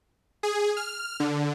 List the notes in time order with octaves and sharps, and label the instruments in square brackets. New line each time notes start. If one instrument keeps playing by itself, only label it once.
[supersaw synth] G#4
F6
D3